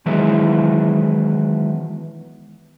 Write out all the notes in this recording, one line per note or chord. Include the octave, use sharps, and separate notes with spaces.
D#3 E3 F#3 G#3 B3 E4